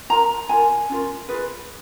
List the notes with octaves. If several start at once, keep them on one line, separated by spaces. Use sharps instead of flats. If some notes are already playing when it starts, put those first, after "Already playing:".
F4 A#4 A#5
F4 A#4 G#5
C#4 F4 A#4
F4 G#4 B4